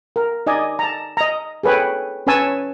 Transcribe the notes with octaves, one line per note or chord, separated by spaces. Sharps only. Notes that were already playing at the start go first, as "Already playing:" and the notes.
A#4
D#4 D5 D#5 G#5
A5 A#5
D#5 A#5
G#4 A4 B4 C#5 G5
C#4 B4 C#5 G#5 A5 E6